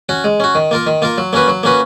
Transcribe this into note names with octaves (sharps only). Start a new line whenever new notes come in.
C#4 F#4
G#3
C#4 F#4
D#3
A#3 F4 A#4
D#3
A#3 F4 A#4
F#3
A#3 C#4 F#4 B4
F#3
A#3 C#4 F#4 B4